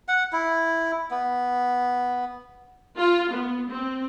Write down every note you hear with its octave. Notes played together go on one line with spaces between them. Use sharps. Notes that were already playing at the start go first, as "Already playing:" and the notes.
F#5
E4
B3
F4
B3
C4